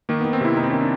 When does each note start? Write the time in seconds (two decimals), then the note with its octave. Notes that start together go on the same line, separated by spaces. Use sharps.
0.09 D#3 A#3
0.21 D#3 B3
0.33 C4
0.41 C3 E4
0.57 C3 D#4
0.63 C4
0.70 D#3 C#4
0.81 D4